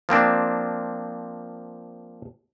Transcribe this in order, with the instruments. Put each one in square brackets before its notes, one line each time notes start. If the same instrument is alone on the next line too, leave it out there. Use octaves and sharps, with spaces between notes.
[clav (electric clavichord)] F3 A#3 C4 D4